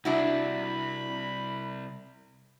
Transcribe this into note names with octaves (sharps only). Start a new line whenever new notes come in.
C2 D4 E4 F#4 B5